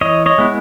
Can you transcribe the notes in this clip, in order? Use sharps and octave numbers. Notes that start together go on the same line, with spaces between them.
E3 C#5 D#5
C#5 D#5
G#3 B3 E4